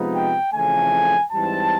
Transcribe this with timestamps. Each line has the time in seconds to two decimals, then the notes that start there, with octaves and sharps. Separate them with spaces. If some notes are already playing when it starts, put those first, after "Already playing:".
Already playing: C3 F3 G#3 B3 D#4
0.14 G5
0.53 F2 C#3 E3 A3 G#5
1.32 G#2 E3 G3 C4 A5